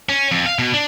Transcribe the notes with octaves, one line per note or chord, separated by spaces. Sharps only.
C#4
F2
F5
B2
D4